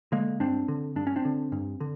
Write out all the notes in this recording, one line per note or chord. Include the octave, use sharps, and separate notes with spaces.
D3 G#3 A#3
G2 C4 D4
D3
G2 D4
C#4
C4 D4
D3
G2
D3